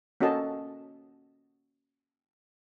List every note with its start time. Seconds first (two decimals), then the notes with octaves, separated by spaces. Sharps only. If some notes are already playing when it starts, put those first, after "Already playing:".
0.20 A#3 C#4 F#4 A4 D#5 A5